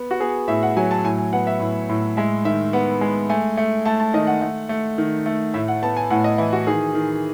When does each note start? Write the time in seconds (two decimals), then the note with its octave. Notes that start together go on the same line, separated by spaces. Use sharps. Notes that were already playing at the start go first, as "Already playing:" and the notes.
Already playing: B3
0.11 F#4
0.20 B3 G#4
0.48 A2 E5
0.63 F#5
0.77 F#3 G#5
0.91 A5
1.04 A2 G#5
1.18 G#5
1.33 B3 F#5
1.47 E5
1.60 A2
1.89 A2
2.17 G#3 E5
2.45 D#3 E5
2.73 B3 F#5
3.01 G#3
3.30 A3 G#5
3.57 A3
3.85 A3 A5
4.00 A5
4.14 D#3 D#5
4.27 F#5
4.42 A3
4.69 A3
4.98 D#3
5.26 A3
5.54 A2 E5
5.68 F#5
5.82 B3 A5
5.97 G#5
6.10 A2 F#5
6.24 D#5
6.38 E3 E4
6.53 F#4
6.67 D#3 G#4
6.94 D#3